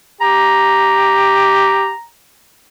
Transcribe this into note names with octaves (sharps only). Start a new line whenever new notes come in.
G4 A#5